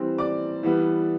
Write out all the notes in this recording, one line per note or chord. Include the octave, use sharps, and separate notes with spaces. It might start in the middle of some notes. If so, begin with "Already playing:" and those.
Already playing: E3 G3 C4
D5 D6
E3 G3 B3